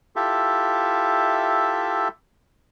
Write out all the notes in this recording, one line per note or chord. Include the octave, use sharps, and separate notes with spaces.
E4 F4 G4 A4 E5